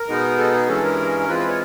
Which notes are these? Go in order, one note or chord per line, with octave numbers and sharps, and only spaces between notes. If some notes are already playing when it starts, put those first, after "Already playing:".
Already playing: A#4
B2 G#3 B3 D#4
A4
G#4
G2 E3 G#3 C#4 A4
A#4
E3 G#3 C4 F4 B4
B4
C#5